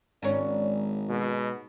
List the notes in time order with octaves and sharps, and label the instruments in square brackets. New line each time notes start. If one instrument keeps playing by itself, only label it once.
[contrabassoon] G#1 [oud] G#2 C#4 [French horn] D5
[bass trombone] B2 [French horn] G#3